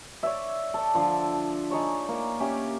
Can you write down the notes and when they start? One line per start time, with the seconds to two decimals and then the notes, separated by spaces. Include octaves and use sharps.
0.23 C#5 D5 E5
0.74 A4 D5
0.95 D3 F3
1.70 D#4 G#4 C#5 D5
2.08 A#3
2.40 C#4 G4 E5